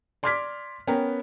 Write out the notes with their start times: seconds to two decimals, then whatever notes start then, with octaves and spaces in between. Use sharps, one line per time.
0.23 D5 C6 D6 F6 G#6 B6
0.87 B3 C#4 A#4 B4 G5 A#5